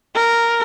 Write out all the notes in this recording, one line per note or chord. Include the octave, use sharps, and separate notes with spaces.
A#4